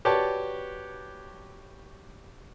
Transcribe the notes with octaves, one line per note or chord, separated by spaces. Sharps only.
F#4 G4 B4 C#5 D5 A5